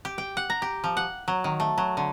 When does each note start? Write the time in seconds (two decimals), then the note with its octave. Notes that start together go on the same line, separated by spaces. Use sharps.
0.05 G4
0.18 G5
0.37 F#5
0.50 A#5
0.62 G4
0.84 F3
0.97 F#5
1.28 F#3
1.44 D#3
1.60 A3
1.78 F#3
1.97 D3